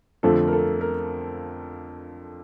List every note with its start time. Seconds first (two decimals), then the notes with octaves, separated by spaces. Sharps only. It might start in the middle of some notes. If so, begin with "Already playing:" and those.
0.23 F2 D3 F3 A3 A4
0.48 A#4
0.53 A4
0.81 A#4